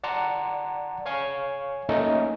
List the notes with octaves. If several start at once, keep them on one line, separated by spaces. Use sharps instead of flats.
D5 F#5 A5 A#5 C6
C#5 F5 G#5 C#6
A3 A#3 C#4 D#4 A4 D#5